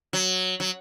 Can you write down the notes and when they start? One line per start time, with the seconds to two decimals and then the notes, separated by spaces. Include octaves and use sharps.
0.13 F#3
0.60 F#3